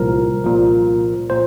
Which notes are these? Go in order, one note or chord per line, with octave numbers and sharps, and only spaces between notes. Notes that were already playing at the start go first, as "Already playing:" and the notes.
Already playing: C2 A#2 F3 A#4
C2 A#2 F3
A#2 C5